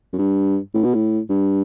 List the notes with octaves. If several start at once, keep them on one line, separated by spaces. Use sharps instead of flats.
F#2
G2
A2
B2
A2
G2